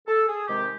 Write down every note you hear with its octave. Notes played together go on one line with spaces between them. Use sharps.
A4
G#4
C3 D#3 G#3 G4